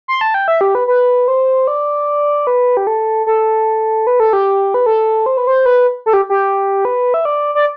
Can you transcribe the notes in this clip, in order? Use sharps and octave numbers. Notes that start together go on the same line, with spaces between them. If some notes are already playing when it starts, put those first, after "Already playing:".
C6
A5
G5
E5
G4
B4
B4
C5
D5
B4
G4
A4
A4
B4
A4
G4
B4
A4
C5
B4
C5
B4
A4
G4
G4
B4
E5
D5
D5